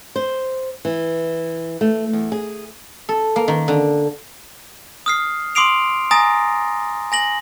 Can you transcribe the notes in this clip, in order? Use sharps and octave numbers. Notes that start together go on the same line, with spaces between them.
C5
E3
A3
E2
G#4
A4
A#3
D#3
D3
D#6 F6 C7
C6 D6 D#6 C7 D7 F7
G#5 A#5 D#6 A6 A#6
G#5 A#6 F#7